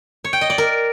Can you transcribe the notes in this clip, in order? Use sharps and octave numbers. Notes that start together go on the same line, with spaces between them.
C#5
G5
D#5
D5
A#4